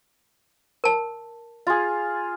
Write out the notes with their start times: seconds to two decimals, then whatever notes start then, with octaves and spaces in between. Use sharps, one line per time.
0.84 A#4 A5
1.67 F4 G#4